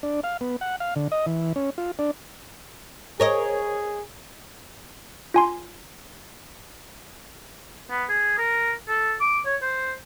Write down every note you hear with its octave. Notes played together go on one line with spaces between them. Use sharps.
D4
F5
B3
F#5
F5
D3
D#5
E3
C#4
F4
D4
G#4 A#4 C#5 D#5
F4 G#5 C6
B3
G#4
A#4
A4
D6
C#5
C5